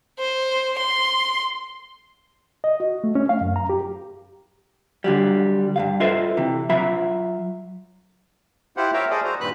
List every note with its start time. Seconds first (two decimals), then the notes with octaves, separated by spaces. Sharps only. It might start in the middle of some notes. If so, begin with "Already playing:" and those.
0.19 C5
0.78 C6
2.64 D#5
2.80 F#4
3.04 A3
3.15 C#4
3.29 F5
3.41 F#2
3.56 A#5
3.69 G4
5.04 D3 F#3 G3
5.76 G2 C#3 F5
6.00 F4 A4 B4 C5 D#5 E5
6.37 C3 E3
6.69 F#3 F4 E5 B5
8.77 E4 F4 G4 C5 F#5
8.94 A#4 C#5 E5 F5 G5 A#5
9.10 G#4 A4 C5 D5 D#5
9.24 F#4 C5 A#5
9.41 G2 A#2 D#3 B4 B5 F#6